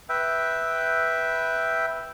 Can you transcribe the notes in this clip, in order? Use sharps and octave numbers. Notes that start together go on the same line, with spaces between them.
B4 E5 G5